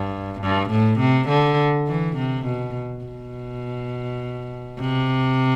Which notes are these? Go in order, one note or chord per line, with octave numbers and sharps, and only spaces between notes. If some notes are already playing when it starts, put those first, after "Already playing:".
Already playing: G2
G2
A2
C3
D3
E3
C3
B2
B2
C3